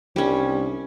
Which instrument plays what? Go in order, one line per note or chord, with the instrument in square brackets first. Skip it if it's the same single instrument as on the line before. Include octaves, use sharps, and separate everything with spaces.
[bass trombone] C2 [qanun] G3 C#4 [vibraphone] D4